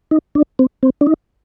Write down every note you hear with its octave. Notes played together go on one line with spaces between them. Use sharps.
D#4
D4
C4
C4
D4
D#4